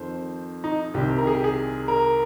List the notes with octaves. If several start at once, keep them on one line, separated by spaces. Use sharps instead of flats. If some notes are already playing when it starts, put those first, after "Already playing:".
Already playing: F2 D#3 C5
D#4
C2 C3 D#3 G4
A#4
G#4
G4
G#4
A#4